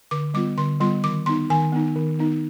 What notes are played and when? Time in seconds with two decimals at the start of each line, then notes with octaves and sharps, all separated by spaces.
0.11 D3 D6
0.34 G3 B3 F4 D6
0.58 D3 C6
0.80 G3 B3 F4 C6
1.04 D#3 D6
1.26 B3 D#4 C6
1.50 D#3 G#5
1.73 B3 D#4
1.96 D#3
2.19 B3 D#4